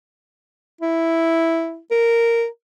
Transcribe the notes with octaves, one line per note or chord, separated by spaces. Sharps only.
E4
A#4